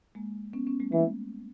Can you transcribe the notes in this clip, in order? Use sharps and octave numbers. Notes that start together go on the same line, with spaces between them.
G#3 A#3
B3 C#4
B3 C#4
G3 A3
E3 G#3 A#3